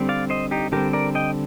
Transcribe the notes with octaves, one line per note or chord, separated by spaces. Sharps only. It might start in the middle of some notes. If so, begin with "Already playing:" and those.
Already playing: D3 G3 C4
D5 F5
C5 D#5
D#4 G4
D3 G3 C4 G4 A#4
A#4 D5
D#5 G5